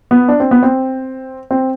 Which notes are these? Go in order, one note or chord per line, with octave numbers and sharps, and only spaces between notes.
B3
D4
C4
B3
C4
C4